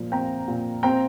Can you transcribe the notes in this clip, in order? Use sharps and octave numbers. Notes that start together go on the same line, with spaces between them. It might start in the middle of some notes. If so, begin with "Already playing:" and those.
Already playing: A#2 F3
C4 G5 A#5
A#2
C4 G5 A#5